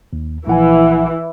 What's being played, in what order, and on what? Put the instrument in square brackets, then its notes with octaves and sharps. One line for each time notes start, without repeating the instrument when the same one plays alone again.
[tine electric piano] D#2
[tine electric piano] A#1 F#5 G#5 [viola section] E3